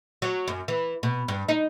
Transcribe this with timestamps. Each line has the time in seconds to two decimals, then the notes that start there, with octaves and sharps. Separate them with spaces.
0.22 F#3
0.48 F#2
0.68 E3
1.03 B2
1.28 G2
1.48 D#4